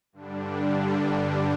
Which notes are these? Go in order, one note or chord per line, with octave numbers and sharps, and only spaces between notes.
G2 D3 G3 D4